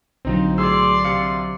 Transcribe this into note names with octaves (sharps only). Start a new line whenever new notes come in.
B1 D3 F#3 C4 D#4 F4
A2 G#4 D5 C6 E6
C3 F5 C#7